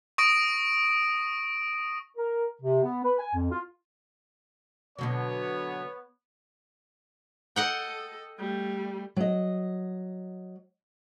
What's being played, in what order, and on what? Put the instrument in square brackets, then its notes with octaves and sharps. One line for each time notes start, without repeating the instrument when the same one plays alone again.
[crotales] C#6 D#6 A#6 D7
[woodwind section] A#4
C3
B3
B4
G#5
F2
F4
[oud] B2 D3 F#3 [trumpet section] B3 C#5
[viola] A4 [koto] D#5 F#5 G5
[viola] G3 A3
[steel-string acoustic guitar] F#3 D#5